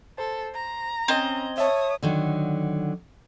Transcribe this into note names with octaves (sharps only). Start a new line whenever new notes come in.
A4 C5
A#5
C4 C#4 D#5 G#6
C#5 E5 A5 D#6
D3 D#3 F#3